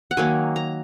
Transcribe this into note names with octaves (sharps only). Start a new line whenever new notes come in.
F#5
D#3 F#3 A#3 G#5
A#5